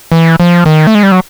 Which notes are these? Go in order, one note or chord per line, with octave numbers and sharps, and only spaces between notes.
E3
F3
D#3
A3
G#3
G3
F#3